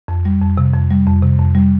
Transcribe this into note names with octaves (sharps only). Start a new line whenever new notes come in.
F2
G3
F2
C3
F2
G3
F2
C3
F2
G3